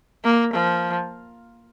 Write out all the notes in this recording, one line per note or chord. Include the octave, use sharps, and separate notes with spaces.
A#3
F3